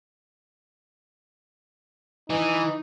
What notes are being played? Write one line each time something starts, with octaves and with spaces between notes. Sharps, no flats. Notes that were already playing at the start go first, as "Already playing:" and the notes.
E3 D#4